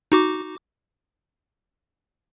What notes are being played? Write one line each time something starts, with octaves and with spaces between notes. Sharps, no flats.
D#4 F#4 D6